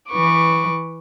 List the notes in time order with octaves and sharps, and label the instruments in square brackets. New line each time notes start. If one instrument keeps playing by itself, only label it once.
[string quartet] E3 B4 C#6 D6